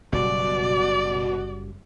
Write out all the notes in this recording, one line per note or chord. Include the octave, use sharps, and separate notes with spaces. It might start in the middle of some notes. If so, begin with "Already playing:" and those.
F#1 B2 F#3 G3 F#4 D5